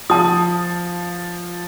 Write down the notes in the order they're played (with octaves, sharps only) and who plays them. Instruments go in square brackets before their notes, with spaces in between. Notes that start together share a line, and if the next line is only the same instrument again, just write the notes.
[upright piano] F3 [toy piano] A5 D#6